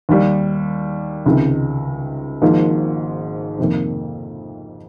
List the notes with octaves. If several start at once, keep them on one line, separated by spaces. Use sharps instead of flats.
D#2 D#3 G3
C#2 C3 D#3
G#1 G#2 F3 A#3
F2 C3 D#3 A#3